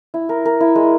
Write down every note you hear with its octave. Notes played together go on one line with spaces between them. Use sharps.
E4
A#4
A#4
E4
G#3